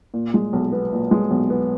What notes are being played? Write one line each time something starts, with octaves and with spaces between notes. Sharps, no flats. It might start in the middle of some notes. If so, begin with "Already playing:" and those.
A#2
G#3
B1
B3
A#2
G#3
B1
B3